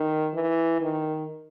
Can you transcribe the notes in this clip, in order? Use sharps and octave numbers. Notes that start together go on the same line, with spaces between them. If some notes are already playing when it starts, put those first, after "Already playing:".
Already playing: D#3
E3
D#3